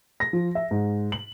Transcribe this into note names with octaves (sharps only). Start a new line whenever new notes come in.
A#6
F3
E5
G#2
F#7